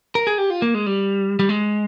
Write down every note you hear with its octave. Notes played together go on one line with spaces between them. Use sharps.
A#4
G#4
G4
F4
A#3
G#3
G3
G3
G#3